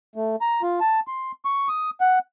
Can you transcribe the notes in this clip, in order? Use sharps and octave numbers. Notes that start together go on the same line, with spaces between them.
A3
A#5
F4
A5
C6
C#6
D#6
F#5